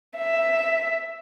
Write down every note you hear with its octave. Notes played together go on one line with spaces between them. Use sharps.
E5